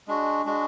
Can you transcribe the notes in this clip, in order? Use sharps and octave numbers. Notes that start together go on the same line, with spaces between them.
G#3 D4 F#4
G#3 D4 F#4